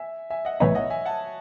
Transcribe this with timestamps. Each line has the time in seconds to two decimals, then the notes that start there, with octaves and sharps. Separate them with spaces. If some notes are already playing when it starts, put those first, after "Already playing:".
Already playing: E5 G#5
0.30 E5 G#5
0.45 D#5 F#5
0.60 B1 A2 E3 B3 D#4 C#5 E5
0.75 D#5 F#5
0.90 E5 G#5
1.06 F#5 A5